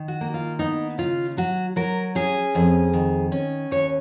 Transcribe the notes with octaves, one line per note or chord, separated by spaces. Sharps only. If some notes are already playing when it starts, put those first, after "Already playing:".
Already playing: D#3
F#4
A#3
F4
B3 D#4
C#3 F4
F#3 F#4
F#3 A#4
C#4 G#4
F2
D#3
C#4
D#2 C#5